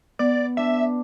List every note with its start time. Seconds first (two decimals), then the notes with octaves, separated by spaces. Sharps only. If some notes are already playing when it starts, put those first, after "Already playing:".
0.19 B3 D5
0.57 D4 E5